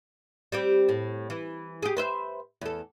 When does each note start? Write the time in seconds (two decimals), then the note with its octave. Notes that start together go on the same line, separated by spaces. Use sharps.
0.52 G3 C4 G4
0.89 A2
1.30 E3
1.83 G4 G#4
1.97 B4 C5 E5
2.61 E2 A4